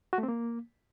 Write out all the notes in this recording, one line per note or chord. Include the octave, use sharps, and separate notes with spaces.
F#4
A3
C4
A#3